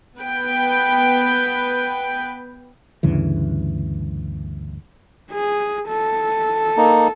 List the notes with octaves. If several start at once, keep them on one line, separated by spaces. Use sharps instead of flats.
B3 B4 G5
D2 G2 C#3 E3
G#4
A4
A#3 D#4